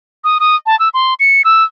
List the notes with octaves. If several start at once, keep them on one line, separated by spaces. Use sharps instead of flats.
D#6
D#6
A5
E6
C6
C#7
E6